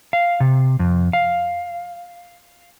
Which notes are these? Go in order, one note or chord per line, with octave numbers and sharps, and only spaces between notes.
F5
C3
F2
F5